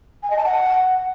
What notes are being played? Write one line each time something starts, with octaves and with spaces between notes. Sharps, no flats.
G#5
D#5
A5
F#5